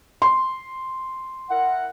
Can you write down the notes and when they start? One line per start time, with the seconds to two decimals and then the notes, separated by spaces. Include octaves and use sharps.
0.22 C6
1.50 E4 A#4 F#5